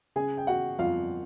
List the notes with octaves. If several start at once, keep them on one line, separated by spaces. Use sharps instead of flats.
C#3 G#4 G#5
G5
C#3 F#4 F#5
F2 F4 F5